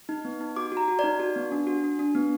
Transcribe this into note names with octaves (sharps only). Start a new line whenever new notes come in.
D#4
B3
D#4
F#4 D6
F#4 A#5
F#4
D#4 D5
F#4
B3
D4
F#4
D4
D4
B3